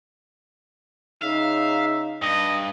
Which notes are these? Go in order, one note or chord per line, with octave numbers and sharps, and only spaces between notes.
C#3 D#4 E5 F5
G2 D#5